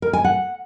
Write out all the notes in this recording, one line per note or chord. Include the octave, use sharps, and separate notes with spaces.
A#4
G#5
F#5